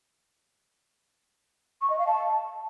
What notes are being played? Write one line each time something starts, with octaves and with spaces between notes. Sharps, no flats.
C#6
D#5
F5
A5